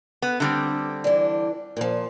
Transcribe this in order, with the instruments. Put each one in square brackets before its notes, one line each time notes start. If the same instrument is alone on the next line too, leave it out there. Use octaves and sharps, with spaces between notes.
[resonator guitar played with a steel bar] B3
D3 G3 C4
[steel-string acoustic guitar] E3 D4
A#2 F3